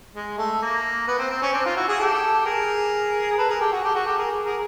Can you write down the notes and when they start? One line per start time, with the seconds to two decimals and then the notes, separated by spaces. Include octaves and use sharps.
0.16 G#3
0.38 A3
0.62 A#3
1.08 B3
1.19 C4
1.31 C4
1.42 C#4
1.54 C4 D4
1.65 D#4 F4
1.77 E4 F#4
1.88 F#4 G#4
1.99 G4 A4
2.45 G#4 A#4
3.38 A4 B4
3.49 G#4 A#4
3.60 G4 A4
3.72 F#4 G#4
3.84 G4 A4
3.95 F#4 G#4
4.06 G4 A4
4.18 G#4 A#4
4.45 G#4 A#4